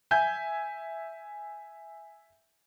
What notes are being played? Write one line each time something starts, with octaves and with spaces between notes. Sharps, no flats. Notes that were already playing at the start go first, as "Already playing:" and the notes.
E5 G#5 G6 G#6